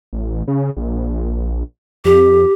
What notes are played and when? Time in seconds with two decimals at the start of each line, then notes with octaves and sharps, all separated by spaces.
0.13 A1
0.48 C#3
0.77 A#1
2.05 F2 G4